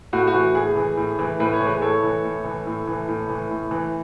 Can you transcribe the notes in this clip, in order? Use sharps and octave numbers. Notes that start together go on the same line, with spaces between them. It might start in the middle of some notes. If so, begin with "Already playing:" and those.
A2 F#4
F#4
E3
A2 G#4
E3
A2
E3
A2 B4
C#5
E3
G#4 B4
A2 A4 C#5
E3
A2
E3
A2
E3
A2
E3
A2
E3